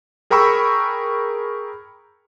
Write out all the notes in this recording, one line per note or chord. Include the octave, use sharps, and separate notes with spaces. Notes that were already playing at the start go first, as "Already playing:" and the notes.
G#4 A#4 G5 B5 C#6 E6